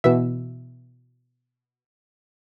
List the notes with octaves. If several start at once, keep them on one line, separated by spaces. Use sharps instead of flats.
B2 E3 E5